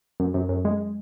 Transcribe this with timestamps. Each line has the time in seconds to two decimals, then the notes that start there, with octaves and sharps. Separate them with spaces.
0.20 F#2
0.34 F#2
0.49 F#2
0.65 G#3